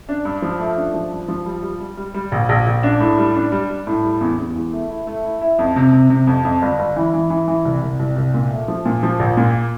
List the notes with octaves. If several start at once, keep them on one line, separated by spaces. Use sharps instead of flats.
D4
G2
F3
A3
D4
F3
G2
F3
G3
G3
G3
G3
G3
A#1
A#1
A#1
D4
A2
G3
D4
G3
G3
A2
G3
E2
E2
E2
A3
E4
A3
E4
E4
F2
C3
C3
C3
F2
F2
G1
G1
E3
E3
E3
E3
C2
C2
C2
C2
A#2
A3
F3
A#2
F3
A#1
A#2